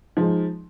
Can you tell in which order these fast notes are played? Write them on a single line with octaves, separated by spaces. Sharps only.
F3 G#3 D#4